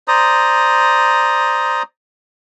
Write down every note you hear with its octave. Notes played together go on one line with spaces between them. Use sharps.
C5 D5 A#5 D#6